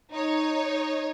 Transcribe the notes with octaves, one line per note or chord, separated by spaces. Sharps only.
D#4 C#5